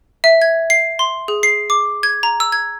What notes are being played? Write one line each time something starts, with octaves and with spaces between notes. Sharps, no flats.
E5
G#6
C7
C6
G#4
C7
D6
G#6
A#5
E6
G#6